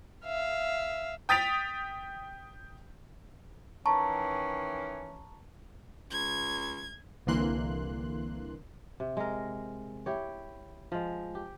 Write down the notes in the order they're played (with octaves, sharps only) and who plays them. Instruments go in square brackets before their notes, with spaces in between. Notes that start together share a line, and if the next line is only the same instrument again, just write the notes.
[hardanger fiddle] E5 F5
[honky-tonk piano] G5 D#6 A6 B6 D7 F7
[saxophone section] D#3 E3 C#4 [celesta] A5 A#5 C#6
[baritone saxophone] C#2 [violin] G#6
[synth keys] C2 D3 E3 A#3 C6 F#6
[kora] C3
G#3 A#4
E4 G4 C#5
F3 G#3
G4